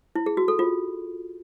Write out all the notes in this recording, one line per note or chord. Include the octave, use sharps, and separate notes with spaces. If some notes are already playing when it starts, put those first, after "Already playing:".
E4
G#4
F#4
A4
F4